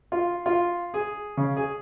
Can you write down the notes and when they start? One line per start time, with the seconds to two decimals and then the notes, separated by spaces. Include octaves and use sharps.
0.12 F4
0.46 F4
0.94 G#4
1.37 C#3
1.57 G#4